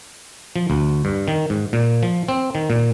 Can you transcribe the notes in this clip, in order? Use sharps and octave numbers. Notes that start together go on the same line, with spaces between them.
F3
D2
G2
D#3
G#2
A#2
F3
C4
D#3
A#2